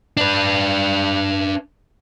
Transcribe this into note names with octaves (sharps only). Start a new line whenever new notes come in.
D4 B4